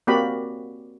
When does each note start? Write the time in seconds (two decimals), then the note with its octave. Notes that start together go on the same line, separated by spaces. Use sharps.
0.07 A#3 C4 F#4 G4 D5 B5